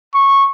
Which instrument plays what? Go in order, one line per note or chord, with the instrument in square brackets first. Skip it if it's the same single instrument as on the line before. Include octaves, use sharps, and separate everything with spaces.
[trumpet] C#6